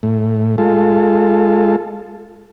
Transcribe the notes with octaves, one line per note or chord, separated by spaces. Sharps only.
A2
G#3 F4 A4